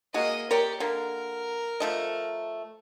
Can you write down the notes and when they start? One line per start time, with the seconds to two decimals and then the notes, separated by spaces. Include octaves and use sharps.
0.14 G#3 A#3 F#4 D#5
0.51 G4 A#4 C#5 D5
0.80 D3 A#3 A#4
1.80 F3 A3 D#5